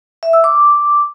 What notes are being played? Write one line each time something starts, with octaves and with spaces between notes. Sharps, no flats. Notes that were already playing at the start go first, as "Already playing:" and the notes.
E5
E6
D6